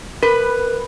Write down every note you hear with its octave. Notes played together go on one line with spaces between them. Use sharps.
A#4 B4